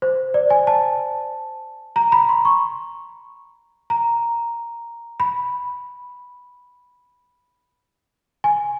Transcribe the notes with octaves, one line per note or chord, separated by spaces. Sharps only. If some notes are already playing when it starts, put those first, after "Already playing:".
C5
D5
G#5
A5
A#5
B5
C6
C#6
A#5
B5
G#5